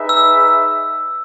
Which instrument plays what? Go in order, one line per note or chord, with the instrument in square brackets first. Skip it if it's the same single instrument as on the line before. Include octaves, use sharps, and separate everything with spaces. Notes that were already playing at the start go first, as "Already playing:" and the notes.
Already playing: [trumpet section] D#4 G#4 B4 E5
[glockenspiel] E6